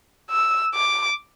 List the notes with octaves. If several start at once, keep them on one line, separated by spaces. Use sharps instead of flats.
E6
D6